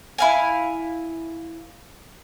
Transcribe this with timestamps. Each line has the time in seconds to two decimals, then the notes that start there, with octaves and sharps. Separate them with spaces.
0.18 E4 F5 G#5